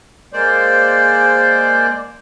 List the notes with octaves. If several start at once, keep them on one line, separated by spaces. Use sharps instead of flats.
G#3 A#3 C5 D5